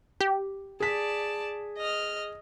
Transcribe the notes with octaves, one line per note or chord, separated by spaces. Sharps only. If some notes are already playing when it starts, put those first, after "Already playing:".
G4
G#4 D5 A5 B6
D#5 F6